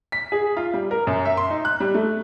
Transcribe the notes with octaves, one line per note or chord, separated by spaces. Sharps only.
B6
G#4
F4
G3
A#4
F#2
E5
C6
D#4
F#6
G3
A3